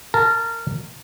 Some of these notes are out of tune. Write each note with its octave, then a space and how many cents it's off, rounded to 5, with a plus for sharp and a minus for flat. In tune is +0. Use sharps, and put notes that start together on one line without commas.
A#4 -20 A5 +0